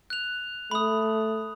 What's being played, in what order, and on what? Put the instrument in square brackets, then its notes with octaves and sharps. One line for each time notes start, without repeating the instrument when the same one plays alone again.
[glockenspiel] F#6 F7
[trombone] A3 [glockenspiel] B5 D#6